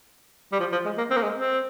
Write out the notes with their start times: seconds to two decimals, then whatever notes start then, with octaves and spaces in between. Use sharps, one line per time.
0.52 G3
0.60 F3
0.72 F3
0.85 G#3
0.98 A#3
1.10 C4
1.17 A#3
1.23 G#3
1.36 C4